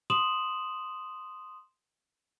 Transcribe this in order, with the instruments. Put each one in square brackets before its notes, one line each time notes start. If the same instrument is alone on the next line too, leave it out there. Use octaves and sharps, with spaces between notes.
[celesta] C6 D#6 E7 F#7